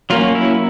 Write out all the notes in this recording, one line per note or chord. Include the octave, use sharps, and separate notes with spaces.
F#3 A#3 C#4 F4
E4